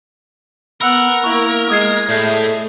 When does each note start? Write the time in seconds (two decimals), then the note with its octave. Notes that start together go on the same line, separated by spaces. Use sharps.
0.81 B3 A#4 F#5 B5 E6
1.24 A#3 E4 C#6
1.70 G#3 D#6 G#6 C7
2.09 A2 A3 G#4 D5 G6 C7